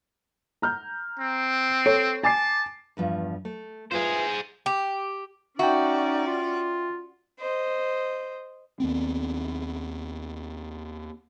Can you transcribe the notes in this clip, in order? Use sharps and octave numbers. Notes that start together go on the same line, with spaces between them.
A#5 F6 G6
C4
A4 C#5 D7
G#5 A5 D6 C7
E2 G2 F3
A3
F4 G#4 B4 C5 E5
G4
C#4 D#4 F#4 D5 E5 G5
F4
C5 D#5
D#2 B3 C4